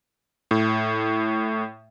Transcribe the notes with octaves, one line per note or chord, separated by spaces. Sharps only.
A2